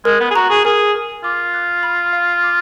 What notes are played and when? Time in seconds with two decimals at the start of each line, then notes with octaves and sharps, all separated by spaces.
0.05 G#3 A#4
0.20 B3
0.30 G#4
0.35 F#4 A#5
0.50 G#4
0.65 G#4 A#4
0.94 A#4
1.24 F4 D6
1.54 F#6
1.83 B5
2.13 F5
2.43 D6